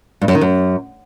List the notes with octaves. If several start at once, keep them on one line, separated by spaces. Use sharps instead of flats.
G2
F#2
D#3
F#2